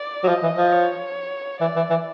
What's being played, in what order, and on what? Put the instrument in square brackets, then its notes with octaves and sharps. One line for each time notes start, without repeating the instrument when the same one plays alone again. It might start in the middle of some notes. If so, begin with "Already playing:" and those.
Already playing: [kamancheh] D5
[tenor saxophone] F#3
[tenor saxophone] F3 [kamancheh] D#5
[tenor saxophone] E3
F3
[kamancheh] C#5
[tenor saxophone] E3 [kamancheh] D5
[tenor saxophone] E3
E3